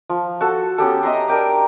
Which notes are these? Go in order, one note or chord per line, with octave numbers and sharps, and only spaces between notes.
F3
F#4 A4
B3 C#4 G4 A4
D#5 E5 A#5 C6
D4 A#4 G5 D6